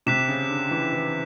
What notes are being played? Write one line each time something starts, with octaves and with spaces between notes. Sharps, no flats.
C3 D6 F#6 B6 E7
C#3
D3
E3
E3